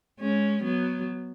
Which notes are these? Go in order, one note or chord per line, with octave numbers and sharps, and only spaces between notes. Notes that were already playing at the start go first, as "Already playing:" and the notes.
G#3 C#4
F#3 B3